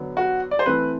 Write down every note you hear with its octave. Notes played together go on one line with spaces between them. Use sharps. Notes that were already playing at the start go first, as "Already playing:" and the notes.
Already playing: D3 F#3 B3
F#4
D5
C5
E3 A3 C4 B4